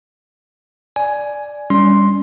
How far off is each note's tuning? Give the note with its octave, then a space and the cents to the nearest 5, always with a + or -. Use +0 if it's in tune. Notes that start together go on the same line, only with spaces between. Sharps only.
D5 +0 G#5 +10
G3 +25 C#4 +30 C6 +5